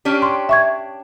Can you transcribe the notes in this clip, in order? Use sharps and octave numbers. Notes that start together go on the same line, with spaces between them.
C#4 D4 G4
C6 C#6
E5 C#6 G#6